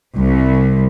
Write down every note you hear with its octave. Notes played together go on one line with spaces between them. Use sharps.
C2